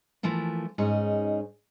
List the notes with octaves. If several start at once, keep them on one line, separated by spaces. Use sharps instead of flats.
E3 F3 A3 A#3
G#2 C#4 D#4 G#4